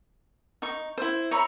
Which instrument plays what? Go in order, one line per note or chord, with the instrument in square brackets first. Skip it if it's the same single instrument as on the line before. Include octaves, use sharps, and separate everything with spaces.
[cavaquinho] D#4 C#6
E4 C5
[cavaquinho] C#5 E5 B5 [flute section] A#5